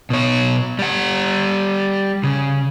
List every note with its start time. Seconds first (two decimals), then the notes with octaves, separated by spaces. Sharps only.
0.10 B2 C#5
0.79 G3 F#5
2.24 C#3